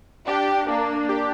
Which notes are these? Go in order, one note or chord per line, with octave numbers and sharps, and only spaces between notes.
D4 G4
A#3 D4
G4